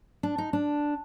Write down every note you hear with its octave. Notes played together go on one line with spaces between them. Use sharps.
D4
D#4
D4